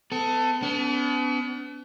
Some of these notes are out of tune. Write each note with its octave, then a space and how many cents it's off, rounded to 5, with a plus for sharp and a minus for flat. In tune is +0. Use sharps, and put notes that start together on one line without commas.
B3 +40 A4 +10
B3 +35 D4 -40